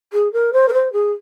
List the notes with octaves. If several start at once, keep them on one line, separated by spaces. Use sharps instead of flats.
G#4
A#4
C5
A#4
C5
G#4